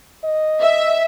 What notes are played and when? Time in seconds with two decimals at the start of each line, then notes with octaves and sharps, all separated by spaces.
0.24 D#5
0.62 E5